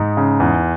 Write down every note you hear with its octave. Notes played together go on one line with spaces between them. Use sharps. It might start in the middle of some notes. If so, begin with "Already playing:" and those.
Already playing: G#2 D#4
C#3
E2